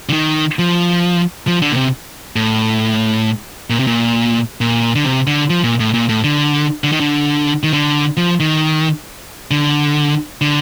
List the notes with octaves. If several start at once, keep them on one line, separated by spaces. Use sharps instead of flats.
D3
D#3
F3
F3
D3
A#2
C3
A2
A#2
C3
A#2
A#2
D3
C3
D3
F3
A#2
A2
A#2
A2
D3
D3
D#3
D3
D#3
D3
F3
D#3
D3
D3